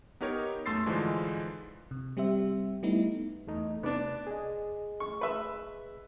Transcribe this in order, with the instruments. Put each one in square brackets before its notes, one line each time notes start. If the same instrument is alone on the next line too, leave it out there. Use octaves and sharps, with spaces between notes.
[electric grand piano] B3 D#4 G4 A#4 C#5
F#2 A3 C6 E6 A6 C7
G#2 D3 E3 F3 G#3
[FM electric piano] C3
G3 C4 G4 C5 E5
G3 A3 B3 D#4 E4
[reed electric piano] E2 A3 D#4
[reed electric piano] C3 D6 A6 [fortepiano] B3 D4
[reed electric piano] G#4 D#5
[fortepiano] C#6
B4 E5